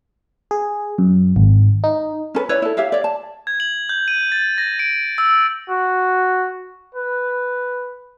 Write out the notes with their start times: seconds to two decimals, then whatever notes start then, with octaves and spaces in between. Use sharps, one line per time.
0.51 G#4
0.98 F#2
1.36 G#1
1.84 D#4
2.35 C#4 A4 B4
2.49 E4 B4 C#5 D5
2.62 E4 A4
2.77 G4 C#5 E5 F5
2.92 C#5 D5
3.04 A5
3.47 G#6
3.60 F#7
3.89 G6
4.08 D#7
4.32 A6
4.58 A#6
4.79 D7
5.18 E6
5.70 F#4
6.95 B4